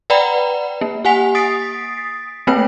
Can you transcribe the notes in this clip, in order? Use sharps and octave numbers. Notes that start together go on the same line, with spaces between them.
B4 D5 F#5 G5 A#5 B5
A#3
G4 F#5 G#5 B6 F7
D#6 A6 B6 C7 D7
A3 A#3 C4 B4 C#5 G5